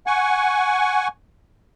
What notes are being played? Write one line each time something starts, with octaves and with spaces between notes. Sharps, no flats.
F#5 G#5 C#6